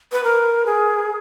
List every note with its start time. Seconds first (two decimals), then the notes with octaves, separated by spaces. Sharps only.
0.12 B4
0.24 A#4
0.66 G#4